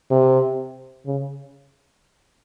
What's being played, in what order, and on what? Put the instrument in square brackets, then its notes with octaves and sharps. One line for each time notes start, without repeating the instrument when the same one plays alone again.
[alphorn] C3
C#3